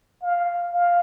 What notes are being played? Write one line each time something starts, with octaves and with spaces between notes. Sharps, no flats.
F5
F5